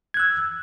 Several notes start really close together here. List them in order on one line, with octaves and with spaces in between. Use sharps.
G#6 F#6 E6